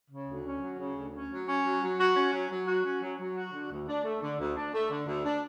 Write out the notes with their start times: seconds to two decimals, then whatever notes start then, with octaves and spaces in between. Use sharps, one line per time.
0.09 C#3
0.26 D2
0.44 C#4
0.60 F#3
0.78 C#3
0.95 D2
1.12 C#4
1.29 F#3
1.47 C#4
1.64 F#3
1.81 F#3
1.98 F#4
2.15 C#4
2.32 F#3
2.49 F#3
2.66 F#4
2.84 C#4
3.01 F#3
3.18 F#3
3.35 F#4
3.53 D3
3.70 D2
3.87 D4
4.04 A3
4.21 D3
4.38 D2
4.55 D4
4.73 A3
4.90 D3
5.06 D2
5.24 D4